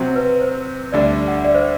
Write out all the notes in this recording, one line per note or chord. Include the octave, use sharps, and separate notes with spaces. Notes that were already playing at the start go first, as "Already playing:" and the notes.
Already playing: C3 F#3 C4
B4
C5
D2 D3 G3 D4 D5
F#5
D5
C5